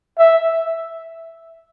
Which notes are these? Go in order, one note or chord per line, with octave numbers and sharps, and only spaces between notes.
E5